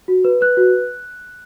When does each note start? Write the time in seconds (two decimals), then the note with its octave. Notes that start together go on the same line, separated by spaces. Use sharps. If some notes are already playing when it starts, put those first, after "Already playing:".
0.08 F#4
0.24 B4
0.41 B4 F#6
0.57 F#4